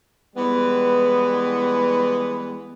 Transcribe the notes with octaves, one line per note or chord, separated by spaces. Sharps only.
E3 G3 G#3 B3